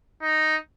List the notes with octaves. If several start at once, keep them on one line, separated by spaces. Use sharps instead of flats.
D#4